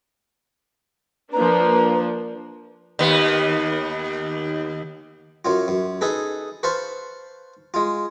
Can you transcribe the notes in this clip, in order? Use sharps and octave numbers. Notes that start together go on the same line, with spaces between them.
F3 A#3 D4 B4 A#5
D#2 B3
F#2 F#3 F4
F#2
D#4 G#4 A4 B4
B4 C5 F5 A5 C#6
G#3 F4